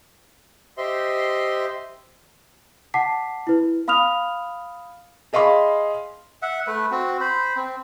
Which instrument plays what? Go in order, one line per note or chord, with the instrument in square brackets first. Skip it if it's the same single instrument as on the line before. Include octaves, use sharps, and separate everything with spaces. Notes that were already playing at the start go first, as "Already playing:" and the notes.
[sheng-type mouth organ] G4 C5 D#5 E5 C6
[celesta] F#5 A5 D6 B6 C7
E4 B4
F5 B5 D#6 F6 F7
[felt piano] G#4 D#5 F5 B5 C6
[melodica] E5 F#5
A3 B4
C4 F#4
C5 B5
C4